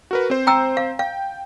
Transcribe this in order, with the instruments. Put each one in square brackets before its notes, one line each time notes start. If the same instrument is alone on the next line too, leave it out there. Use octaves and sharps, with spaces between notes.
[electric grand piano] F#4 A#4 B4
C4 C5
[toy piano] G5 A#5 E6
F5
[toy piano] F5 [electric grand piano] G5